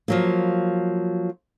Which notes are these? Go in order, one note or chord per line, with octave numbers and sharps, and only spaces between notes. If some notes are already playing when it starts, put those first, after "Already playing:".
F3 F#3 A#3